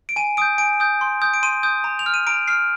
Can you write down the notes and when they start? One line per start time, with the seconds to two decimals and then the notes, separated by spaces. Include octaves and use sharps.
0.09 D7
0.16 G#5 D#7
0.37 D#6 G6 D7
0.58 G#5 D7
0.80 D#6 G6
1.01 C6
1.22 D#6 G6
1.34 D7
1.43 C6 D#7
1.63 D#6 G6
1.84 A#5
1.99 F7
2.06 F6
2.14 D#7
2.27 A#5 D7
2.48 F6 C7